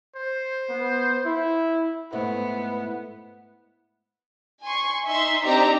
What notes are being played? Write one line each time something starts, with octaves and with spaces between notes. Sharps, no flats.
C5
B3
E4
G#2 A3 B3 E4
G#5 C6 C#6
D#4 E5 C6
C4 D4 D#4 G4 D5 A#5